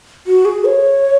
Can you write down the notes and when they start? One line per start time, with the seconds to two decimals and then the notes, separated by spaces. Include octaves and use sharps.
0.27 F#4
0.45 G#4
0.65 C#5